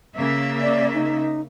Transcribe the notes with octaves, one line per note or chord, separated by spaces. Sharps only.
C#3 A#3 E5
D5
D#4